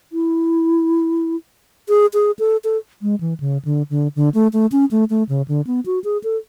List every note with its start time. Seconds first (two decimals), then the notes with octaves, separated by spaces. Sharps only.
0.12 E4
1.89 G#4
2.14 G#4
2.39 A4
2.64 A4
3.02 G#3
3.21 E3
3.40 C#3
3.65 D3
3.90 D3
4.16 D3
4.34 A3
4.53 A3
4.72 C#4
4.91 A3
5.10 A3
5.29 C#3
5.48 D3
5.67 B3
5.86 F#4
6.04 G#4
6.24 A4